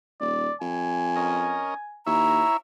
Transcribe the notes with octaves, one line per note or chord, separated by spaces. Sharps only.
D#1 D5
F2 G#5
C#4 A#4 D#5
D#2 E4 C#5 E5 A#5